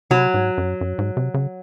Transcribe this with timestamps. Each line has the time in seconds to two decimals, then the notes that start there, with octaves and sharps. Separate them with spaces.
0.11 C3 F#3
0.34 G#2
0.58 F#2
0.81 F#2
0.99 G#2
1.17 C3
1.34 C#3